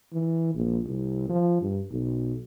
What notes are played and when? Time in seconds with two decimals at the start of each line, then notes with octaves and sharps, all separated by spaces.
0.13 E3
0.55 A#1
0.86 C2
1.29 F3
1.61 G2
1.91 B1